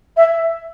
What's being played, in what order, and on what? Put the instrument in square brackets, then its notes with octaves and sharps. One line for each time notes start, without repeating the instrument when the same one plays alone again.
[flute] E5